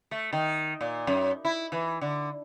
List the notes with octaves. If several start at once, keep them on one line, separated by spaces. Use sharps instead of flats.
A3
D#3
A#2
F#2
E4
E3
D3